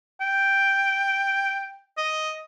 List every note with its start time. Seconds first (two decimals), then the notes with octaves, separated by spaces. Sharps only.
0.21 G5
1.97 D#5